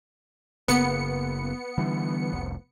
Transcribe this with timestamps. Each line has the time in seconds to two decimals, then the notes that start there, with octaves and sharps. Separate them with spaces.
0.68 F#1 C#3 A#3 B3 C#7
1.78 D3 E3 G3
2.32 F1 C2